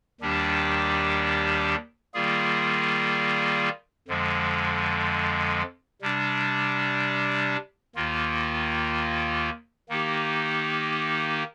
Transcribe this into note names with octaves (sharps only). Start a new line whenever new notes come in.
D#2 D#3 G3 D4 G4
D#3 G3 A#3 F4 G#4
F2 D3 F3 G#3
C3 G3 D4
D#2 D#3 A#3 F4
D#3 A#3 D#4 G4